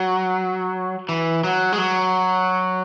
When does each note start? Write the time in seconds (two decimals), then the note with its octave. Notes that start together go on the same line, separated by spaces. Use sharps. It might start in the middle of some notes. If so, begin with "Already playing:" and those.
Already playing: F#3
1.09 E3
1.44 F#3
1.73 G#3
1.78 F#3